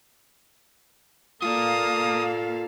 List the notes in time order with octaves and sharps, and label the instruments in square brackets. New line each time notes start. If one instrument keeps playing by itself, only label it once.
[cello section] A#3 F5 [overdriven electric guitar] F4 D5 [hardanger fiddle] A4 [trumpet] D#6